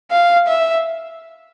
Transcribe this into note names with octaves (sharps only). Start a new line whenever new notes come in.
F5
E5